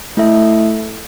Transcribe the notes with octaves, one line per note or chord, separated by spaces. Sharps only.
A3 E4 A4 E5